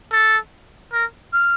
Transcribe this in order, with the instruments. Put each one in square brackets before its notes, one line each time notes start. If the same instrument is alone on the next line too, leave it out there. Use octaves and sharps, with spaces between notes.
[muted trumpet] A4
A#4
[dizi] F6